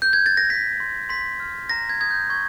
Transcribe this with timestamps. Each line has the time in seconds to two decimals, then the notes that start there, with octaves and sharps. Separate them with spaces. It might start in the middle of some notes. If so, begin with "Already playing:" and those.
0.02 G6
0.13 G#6
0.26 A6
0.37 A#6
0.50 G6 B6
0.80 C6
1.09 C6 B6
1.40 F6
1.70 A#5 A#6
1.89 G#6
2.01 D#6 G#6
2.11 G6
2.30 C#6 G#6